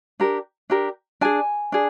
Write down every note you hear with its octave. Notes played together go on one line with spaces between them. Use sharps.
D4 G4 A#4
D4 G4 A#4
D4 G#4 G#5
D4 G#4